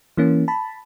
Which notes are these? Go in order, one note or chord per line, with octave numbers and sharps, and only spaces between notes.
E3 A#3 C#4
A5 B5